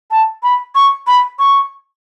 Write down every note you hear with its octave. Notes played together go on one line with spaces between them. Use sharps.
A5
B5
C#6
B5
C#6